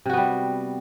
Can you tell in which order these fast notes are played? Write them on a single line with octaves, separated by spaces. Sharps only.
C3 F#4 B3 G3